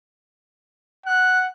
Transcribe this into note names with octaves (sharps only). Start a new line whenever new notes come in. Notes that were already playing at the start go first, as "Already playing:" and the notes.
F#5 F#6